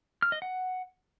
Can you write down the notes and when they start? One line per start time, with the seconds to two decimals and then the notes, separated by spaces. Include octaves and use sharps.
0.22 F6
0.32 D#5
0.42 F#5